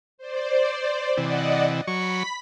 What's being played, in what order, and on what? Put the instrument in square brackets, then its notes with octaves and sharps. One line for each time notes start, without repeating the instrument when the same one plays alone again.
[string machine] C5 D5
[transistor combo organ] C3 E3 [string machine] D5 D#5 F#5
[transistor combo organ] F#3 C#6 [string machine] B5 B6